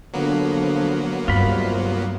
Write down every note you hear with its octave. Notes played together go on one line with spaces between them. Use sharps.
D3 F3 F#3 A#3 B3
C2 G2 F4 B5